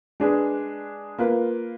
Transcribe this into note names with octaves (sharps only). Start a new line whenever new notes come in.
G#3 D4 G#4 B4
A#3 F4 B4